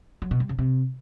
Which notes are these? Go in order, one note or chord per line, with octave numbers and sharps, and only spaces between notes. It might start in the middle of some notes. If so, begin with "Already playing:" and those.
F#3
B2
G3
C#3
C3